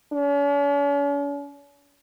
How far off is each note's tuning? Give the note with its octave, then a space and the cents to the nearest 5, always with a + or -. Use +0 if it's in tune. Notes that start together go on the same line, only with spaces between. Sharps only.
C#4 +45